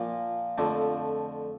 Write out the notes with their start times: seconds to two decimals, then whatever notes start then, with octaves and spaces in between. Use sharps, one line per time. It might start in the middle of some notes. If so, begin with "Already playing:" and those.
Already playing: A#2 F3 A#3
0.58 F2 D3 F3 A3